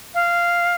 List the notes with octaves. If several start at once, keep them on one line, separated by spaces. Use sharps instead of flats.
F5